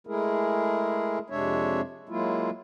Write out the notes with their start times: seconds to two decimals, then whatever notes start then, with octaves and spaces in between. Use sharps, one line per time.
0.07 G#3 A3 E4 G#4 A#4
1.30 F2 C3 G#3 D4 C#5 E5
2.09 F#3 G#3 A#3 E4 F4